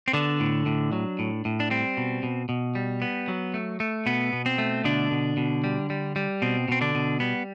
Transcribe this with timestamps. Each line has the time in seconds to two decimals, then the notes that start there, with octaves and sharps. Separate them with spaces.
0.08 C4
0.13 D3 B3 D4
0.40 A2
0.66 A2
0.92 F#3
1.19 A2
1.45 A2
1.60 D4
1.70 G3 C4
1.97 B2
2.23 B2
2.49 B2
2.75 G3
3.02 B3
3.28 F#3
3.54 A3
3.80 A3
4.06 B2 B3
4.33 B2
4.46 C4
4.58 A3
4.84 B2 D3 D4
5.11 B2
5.37 B2
5.64 G3
5.90 G3
6.16 G3
6.42 B2 C4
6.68 B2 C4
6.81 D3 D4
6.95 B2
7.20 G3 B3